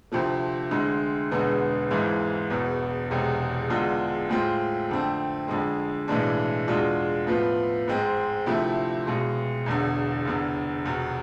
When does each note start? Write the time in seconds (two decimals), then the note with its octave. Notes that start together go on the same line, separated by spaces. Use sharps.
0.12 D2 C3 F3 A3
0.71 D2 D3 G#3
1.31 E1 E2 D3 G#3 B3
1.91 G#1 G#2 E3 G#3
2.50 E1 E2 B2 B3
3.10 E1 E2 C3 G#3
3.70 E2 D3 G#3 D4 F4
4.29 A2 G#3 C4 F4
4.89 F2 D3 A3 C4
5.48 F2 D3 G#3
6.08 B1 A2 E3 G#3 D4
6.68 E2 B2 G#3 D4 F4
7.27 A2 F3 B3 F4
7.88 G#2 G#3 C4
8.46 D2 C3 F3 A3 E4
9.07 B1 B2 G#3
9.66 E1 E2 D3
10.25 F1 E2 D3
10.85 F1 E2 B2